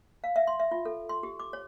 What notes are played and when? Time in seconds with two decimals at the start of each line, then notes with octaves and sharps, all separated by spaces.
0.24 F5
0.36 E5
0.47 C6
0.60 E5
0.71 F4
0.85 A4
1.09 C6
1.23 G4
1.40 D6
1.53 C#5